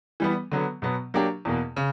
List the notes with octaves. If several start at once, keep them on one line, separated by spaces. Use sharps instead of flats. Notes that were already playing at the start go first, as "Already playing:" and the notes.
E3 G3 B3
D3 F#3 B3
B2 F#3 B3
F#3 A#3 D4 G4
E2 B2 A#3
C#3